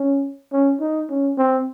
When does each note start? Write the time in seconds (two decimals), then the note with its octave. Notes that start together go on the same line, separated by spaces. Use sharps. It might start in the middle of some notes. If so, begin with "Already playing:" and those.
Already playing: C#4
0.52 C#4
0.80 D#4
1.10 C#4
1.38 C4